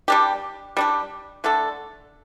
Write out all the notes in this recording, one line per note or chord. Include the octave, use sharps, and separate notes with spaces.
G3 D4 G4
G3 D4 G4
D3 A3 D4 A4